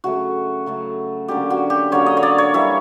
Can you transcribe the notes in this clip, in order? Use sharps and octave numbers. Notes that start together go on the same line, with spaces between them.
C#3 F#3 A3 F#4
C#3 F#3 A3
D3 F#3 A#3 C#4 G4
F#4
G4
D3 F#3 A#3 C#4 C#5
D#5
C#5
D5
C#5
E3 G3 A#3 E5